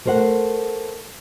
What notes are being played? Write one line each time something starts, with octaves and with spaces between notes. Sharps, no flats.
A3 A#4 C5 D5 F#5